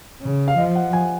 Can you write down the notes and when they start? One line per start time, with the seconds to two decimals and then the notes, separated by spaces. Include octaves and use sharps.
0.22 C#3
0.48 F5
0.57 F3 D#5
0.76 F#5
0.93 G#5